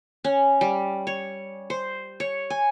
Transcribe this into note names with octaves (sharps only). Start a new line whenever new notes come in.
C#4
G3
C#5
C5
C#5
G#5